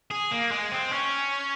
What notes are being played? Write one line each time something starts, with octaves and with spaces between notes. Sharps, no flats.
G#4
A#3
G#3
C4
C#4